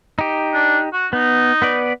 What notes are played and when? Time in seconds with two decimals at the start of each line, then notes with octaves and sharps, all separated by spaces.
0.19 D#4 G4
0.54 D4
0.93 F#4
1.13 B3 D#4
1.62 B3 B4 D5